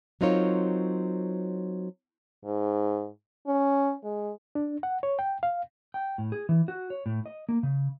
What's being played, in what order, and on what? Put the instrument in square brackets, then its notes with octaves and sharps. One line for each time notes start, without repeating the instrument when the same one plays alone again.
[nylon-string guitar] F#3 C4 D#4 F4 A#4 C#5
[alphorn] G#2
C#4
G#3
[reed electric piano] D4
F#5
C#5
G5
F5
[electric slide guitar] G5
A2
G#4
E3
F#4
C#5
A2
D#5
A#3
C#3